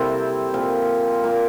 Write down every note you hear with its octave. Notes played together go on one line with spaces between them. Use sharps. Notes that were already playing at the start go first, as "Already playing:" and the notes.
Already playing: C3 G3 A#3 C4 E4 A4
A#2 F3 C4 F4
A#3 F4 A#4 D5